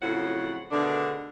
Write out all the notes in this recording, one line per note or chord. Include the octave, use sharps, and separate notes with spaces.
F2 A2 C#3 F3 F#3 F#5
B2 D3 D#3 A3 D4 G#4